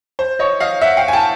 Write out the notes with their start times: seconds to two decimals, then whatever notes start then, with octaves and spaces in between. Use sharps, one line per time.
0.19 C5
0.39 C#5 D#5
0.60 D#5 F5
0.81 E5 F#5
0.97 F5 G5
1.08 G#5
1.13 G5 A5